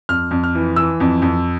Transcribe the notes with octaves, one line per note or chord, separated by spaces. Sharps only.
F2 F6
F2
F6
E3
E3 E6
F2
F2